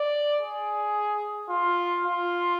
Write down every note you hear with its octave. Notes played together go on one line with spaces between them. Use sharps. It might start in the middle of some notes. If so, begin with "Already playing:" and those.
Already playing: D5
G#4
F4
F4